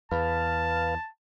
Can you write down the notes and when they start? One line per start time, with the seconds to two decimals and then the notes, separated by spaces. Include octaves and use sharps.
0.12 E2 B4 F5 A5